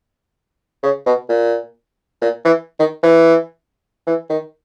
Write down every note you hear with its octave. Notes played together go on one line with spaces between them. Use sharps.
C#3
B2
A#2
A#2
E3
D#3
E3
E3
D#3